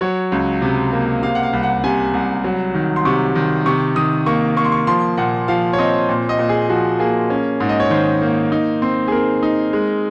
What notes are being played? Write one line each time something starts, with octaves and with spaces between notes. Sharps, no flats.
F#3 C#5
C#2
C3
A#3
C3 F5
F#5
F5
C2
F#5
C3 G#5
C2
F#3
D#3
C6
C3 C#6
D#3
C3 C#6
D#3 D#6
A#3 C#6
A#3 C#6
C6
C#6
F3 C6
A#2 F#5
F3 F5
C#5
C4 D#5
A#2
D#5
A#2
G#4
F3 F#4
A#3 G#4
C#4
G#2
D#5
C#5
D#3 C5
A#3
D#4
C4
G#4
C4 A#4
D#4
G#3